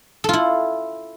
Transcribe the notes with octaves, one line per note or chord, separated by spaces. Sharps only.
E4 F4 A4